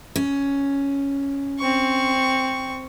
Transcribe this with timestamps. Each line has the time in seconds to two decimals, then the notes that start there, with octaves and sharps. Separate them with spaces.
0.16 C#4
1.59 C4 C#6